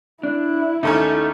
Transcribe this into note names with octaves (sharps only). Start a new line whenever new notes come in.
D4 E4
D#2 A3 C#4 D#4 A4